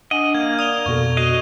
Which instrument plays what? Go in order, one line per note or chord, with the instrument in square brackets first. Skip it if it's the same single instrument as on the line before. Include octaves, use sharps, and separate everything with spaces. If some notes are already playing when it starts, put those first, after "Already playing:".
[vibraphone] D4 [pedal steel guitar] D#5 [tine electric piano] F#5 G#5 [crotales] D#7
[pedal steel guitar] A#3 [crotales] G#6
[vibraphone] D5 [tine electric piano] D#6 [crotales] D#7 F7 G7
[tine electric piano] F2 B2 A4 [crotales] C#6
[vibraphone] F#4 [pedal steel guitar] D#5 [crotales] C7 D#7